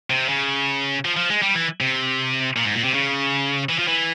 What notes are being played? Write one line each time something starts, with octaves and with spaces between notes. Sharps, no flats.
C3
C#3
F3
F3
G#3
G3
E3
C3
A#2
G#2
A#2
C3
C#3
E3
F3
E3